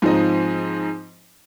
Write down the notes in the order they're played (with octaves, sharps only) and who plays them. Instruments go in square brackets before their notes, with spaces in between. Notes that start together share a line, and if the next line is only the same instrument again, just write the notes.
[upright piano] G#2 F3 C4 D#4